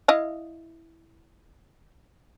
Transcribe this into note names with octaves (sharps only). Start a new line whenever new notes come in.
E4 D#5 F5